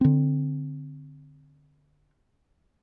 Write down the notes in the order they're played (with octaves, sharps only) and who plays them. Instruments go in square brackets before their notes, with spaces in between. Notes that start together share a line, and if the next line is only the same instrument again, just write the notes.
[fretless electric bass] D3 C4